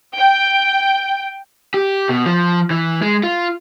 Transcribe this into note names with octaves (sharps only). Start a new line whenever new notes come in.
G5
G4
B2
F3
E3
G#3
F4